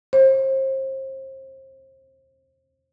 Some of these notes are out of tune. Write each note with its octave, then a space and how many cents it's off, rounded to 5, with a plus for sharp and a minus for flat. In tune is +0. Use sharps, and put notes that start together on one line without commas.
C5 +35